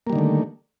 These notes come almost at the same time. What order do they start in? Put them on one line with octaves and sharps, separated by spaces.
A#3 G3 D#3 D3 A3